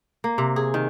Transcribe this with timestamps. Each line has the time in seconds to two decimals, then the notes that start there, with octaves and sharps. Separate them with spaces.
0.24 A#3
0.38 C3
0.56 G#4
0.74 D#3